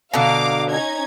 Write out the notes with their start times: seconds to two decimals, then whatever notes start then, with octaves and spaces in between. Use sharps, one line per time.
0.14 B2 D3 F5 A#5 D6
0.70 C#4 D#4 G#6